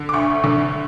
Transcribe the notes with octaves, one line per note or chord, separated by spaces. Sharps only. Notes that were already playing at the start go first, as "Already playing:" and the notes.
Already playing: D3
D6
D2 C#6
D3